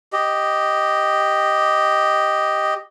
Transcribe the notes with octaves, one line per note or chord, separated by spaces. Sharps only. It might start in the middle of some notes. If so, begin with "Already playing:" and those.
G4 D#5